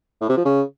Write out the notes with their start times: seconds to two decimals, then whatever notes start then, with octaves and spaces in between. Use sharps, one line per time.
0.21 A2
0.29 C3
0.37 F3
0.45 C#3